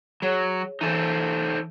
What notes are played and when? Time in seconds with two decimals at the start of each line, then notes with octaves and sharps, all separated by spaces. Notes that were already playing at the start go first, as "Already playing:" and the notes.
0.22 F#3 G#4 C#5
0.81 E3 D#4 A4 C5 G#5